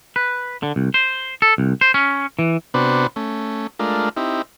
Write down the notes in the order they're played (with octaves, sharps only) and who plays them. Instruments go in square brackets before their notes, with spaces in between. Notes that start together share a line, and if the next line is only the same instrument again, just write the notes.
[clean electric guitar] B4
D3
C2
C5
A4
C2
C5
C#4
E3
[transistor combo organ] C3 B3 D4 F#4 B4 C5
A3 C#4
G#3 A3 D4 F4 A#4
C4 D#4 E4 G4